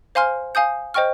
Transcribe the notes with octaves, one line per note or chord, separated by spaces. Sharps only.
C5 F5 G#5 C6 F6
F5 G#5 D#6 G6
C5 D#5 G5 C#6 F6